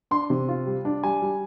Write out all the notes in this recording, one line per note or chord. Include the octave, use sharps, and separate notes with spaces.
D4 C6
C3
F4
G3
D4
G3 G#5
G3